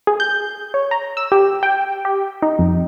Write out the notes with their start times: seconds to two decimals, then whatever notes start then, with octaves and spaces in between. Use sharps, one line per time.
0.07 G#4
0.20 G6
0.74 C#5
0.91 A#5
1.17 E6
1.32 G4
1.63 G5
2.05 G4
2.42 D#4
2.59 F2